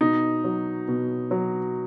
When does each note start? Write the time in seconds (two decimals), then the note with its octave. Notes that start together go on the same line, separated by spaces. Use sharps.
0.01 B2 D#4
0.44 F#3
0.88 B2
1.31 F#3